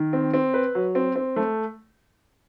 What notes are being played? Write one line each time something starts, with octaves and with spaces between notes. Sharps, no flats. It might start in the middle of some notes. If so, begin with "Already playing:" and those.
Already playing: D#3
C4
C4
B4
F#3
C4
C4
A3